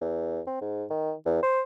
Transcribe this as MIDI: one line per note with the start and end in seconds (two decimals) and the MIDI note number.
0.01 0.41 40
0.47 0.60 60
0.61 0.85 44
0.90 1.13 51
1.26 1.41 40
1.43 1.62 72